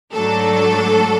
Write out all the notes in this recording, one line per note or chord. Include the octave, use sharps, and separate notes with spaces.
G#2 F#3 A3 D4 A4